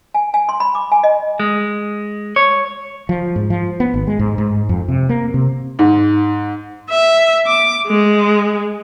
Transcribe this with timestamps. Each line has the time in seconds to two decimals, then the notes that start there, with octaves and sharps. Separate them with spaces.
0.14 G#5
0.34 G#5
0.49 C6
0.60 B5
0.75 D6
0.92 G#5
1.03 D#5
1.40 G#3
2.36 C#5
3.09 F3
3.36 G#2
3.50 F3
3.80 B3
3.94 G#1
4.07 G#3
4.19 G#2
4.38 G#2
4.69 F2
4.88 C3
5.09 A#3
5.34 C3
5.79 G#2
6.90 E5
7.47 D6
7.87 G#3